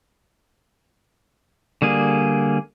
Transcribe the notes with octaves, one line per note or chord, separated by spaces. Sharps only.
D3 G3 A#3 G#4